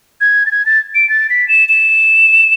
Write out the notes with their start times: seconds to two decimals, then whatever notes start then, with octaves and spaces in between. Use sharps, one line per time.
0.21 G#6
0.46 A6
0.51 G#6
0.66 A6
0.95 D7
1.09 A6
1.30 B6
1.48 E7
1.69 E7